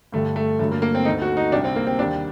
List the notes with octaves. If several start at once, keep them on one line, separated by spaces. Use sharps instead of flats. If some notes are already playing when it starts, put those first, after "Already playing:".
G2 D3 G3 A3
A3
G2 D3 F#3 A3
A#3
A#3
C4
D2 D3 A3 D#4
F#4
D#4
C2 C3 G3 D4
C4
A#3
C4
D#2 D#3 G3 D4